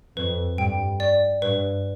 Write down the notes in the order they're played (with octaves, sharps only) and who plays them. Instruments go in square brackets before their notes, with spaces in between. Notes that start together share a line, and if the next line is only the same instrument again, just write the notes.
[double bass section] F2 [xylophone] B4
[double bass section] G2 [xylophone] G5
[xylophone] D5
[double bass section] G2 [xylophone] B4